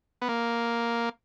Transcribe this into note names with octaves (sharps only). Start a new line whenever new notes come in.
B3
A#3